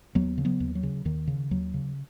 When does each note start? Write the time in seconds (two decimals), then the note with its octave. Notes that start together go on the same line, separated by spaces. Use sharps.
0.15 D#2 F#3 B3
0.38 C#3
0.45 F#3 B3
0.60 D#2
0.75 F#3
0.83 C#3
1.05 D#2 D#3
1.27 C#3
1.51 D#2 F#3
1.74 C#3